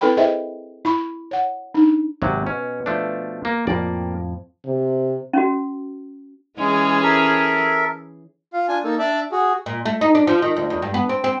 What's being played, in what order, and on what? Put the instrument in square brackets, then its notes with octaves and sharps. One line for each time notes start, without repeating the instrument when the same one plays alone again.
[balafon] C4 E4 A4 B4 G5 B5
E4 G#4 C5 D#5 E5 G5
E4 B5 C#6
C#5 F#5
D4 D#4
[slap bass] G#1 [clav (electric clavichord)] C3 F#3
[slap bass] B2 [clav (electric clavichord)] C#4
[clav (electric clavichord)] F3 A3 D4
A#3
[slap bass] F2 A2 F3 [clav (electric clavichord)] A#3 D5
[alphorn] C3
[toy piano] C#4 F#4
[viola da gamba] E3 C#4 G#4 [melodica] G#3
[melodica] A4 A#4 E5
[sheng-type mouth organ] F4 F5
D4 F4 G#5
A#3 D#4 A4
D4 D5 E5
F#4 G#4
[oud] A#2
A3
D#4
D4
F3
D#3
D2
E2
G2
B3
C4
C4